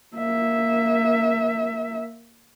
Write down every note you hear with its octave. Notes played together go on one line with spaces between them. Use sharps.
A#3 E5